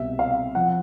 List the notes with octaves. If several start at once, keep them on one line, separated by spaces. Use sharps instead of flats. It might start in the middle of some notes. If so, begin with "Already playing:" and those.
Already playing: C2 B2 E5
F5
F3 F#5